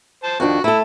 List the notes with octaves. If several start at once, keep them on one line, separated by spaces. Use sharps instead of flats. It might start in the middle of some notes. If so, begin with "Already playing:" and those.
C5 A5
F2 D#3 D4 F#4
A3 E4 A4